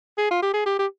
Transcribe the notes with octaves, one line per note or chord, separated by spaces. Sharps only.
G#4
F4
G4
G#4
G4
G4